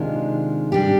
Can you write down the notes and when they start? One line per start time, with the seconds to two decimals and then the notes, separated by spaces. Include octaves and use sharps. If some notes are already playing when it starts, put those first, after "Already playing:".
Already playing: C3 D#3 G#3 D4 F4
0.72 G3 D4 G4